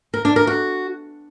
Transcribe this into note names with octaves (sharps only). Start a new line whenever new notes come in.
A#4
D4
A#4
F#4